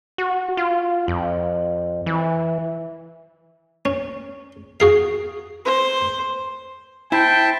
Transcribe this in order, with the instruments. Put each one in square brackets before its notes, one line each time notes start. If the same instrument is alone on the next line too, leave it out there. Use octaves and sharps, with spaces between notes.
[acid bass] F#4
F4
F2
E3
[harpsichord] C#4
F#4 G#4 F5
[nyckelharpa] C5
[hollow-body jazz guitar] E4 [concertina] C5 E5 A5 [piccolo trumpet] G5